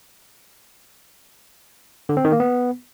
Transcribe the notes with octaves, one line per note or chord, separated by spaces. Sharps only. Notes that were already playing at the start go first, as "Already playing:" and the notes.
D3
C4
D#3
A#3
B3